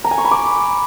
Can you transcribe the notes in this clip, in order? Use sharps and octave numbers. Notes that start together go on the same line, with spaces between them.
A#5
G#5
C#6
B5
D6